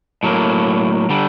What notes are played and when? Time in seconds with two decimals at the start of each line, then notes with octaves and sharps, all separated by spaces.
0.23 A2 F#3 A#3
1.09 D3 G3